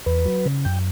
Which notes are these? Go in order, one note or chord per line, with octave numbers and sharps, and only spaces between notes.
E2 B4
F#3
C#3
F#2 G5